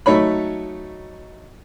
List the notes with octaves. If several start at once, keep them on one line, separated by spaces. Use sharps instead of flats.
F#3 A3 D#4 C#5 B5